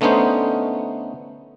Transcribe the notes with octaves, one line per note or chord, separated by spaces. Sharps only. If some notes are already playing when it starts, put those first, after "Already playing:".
D3 A3 B3 C#4 D#4 C5